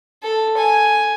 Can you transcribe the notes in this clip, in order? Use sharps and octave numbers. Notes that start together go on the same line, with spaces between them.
A4
G#5